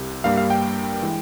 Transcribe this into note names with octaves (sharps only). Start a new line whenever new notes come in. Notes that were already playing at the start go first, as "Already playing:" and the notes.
Already playing: C2 C3
G2 G3 A#3 F5
F5
G5
E3 G#3